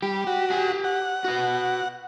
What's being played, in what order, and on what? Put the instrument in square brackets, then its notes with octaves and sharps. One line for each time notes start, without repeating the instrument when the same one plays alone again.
[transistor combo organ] G3 [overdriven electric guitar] G4
[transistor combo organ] F#4
[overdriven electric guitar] G4 G#5
[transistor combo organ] F#5
[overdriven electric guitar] F#4 B4